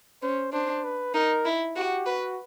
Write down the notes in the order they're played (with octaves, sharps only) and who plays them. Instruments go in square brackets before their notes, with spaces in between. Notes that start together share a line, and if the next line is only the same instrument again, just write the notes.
[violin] C#4 [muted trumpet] C5
[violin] D4 [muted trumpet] C5
[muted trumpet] B4
[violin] D#4 [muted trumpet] A#4
[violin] E4
[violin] F#4 [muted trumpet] G4
[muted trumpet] F#4 [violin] B4